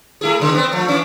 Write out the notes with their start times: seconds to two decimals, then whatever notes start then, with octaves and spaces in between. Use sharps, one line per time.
0.21 A3 E4 G#4
0.40 E2 C#3 G#3
0.55 B3 C4
0.72 F3 A3
0.88 E3 C#4 D4